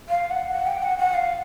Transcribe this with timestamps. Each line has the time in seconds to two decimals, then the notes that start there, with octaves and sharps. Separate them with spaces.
0.09 F5
0.30 F#5
0.52 F#5
0.67 G5
0.82 F#5
0.98 F#5
1.14 F5